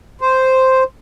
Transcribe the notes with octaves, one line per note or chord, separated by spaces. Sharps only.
C5